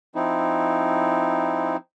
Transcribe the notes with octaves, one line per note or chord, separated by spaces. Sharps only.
F3 C4 D#4 E4